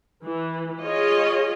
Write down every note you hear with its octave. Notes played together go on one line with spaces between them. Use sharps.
E3
F4 G#4 C#5 D#5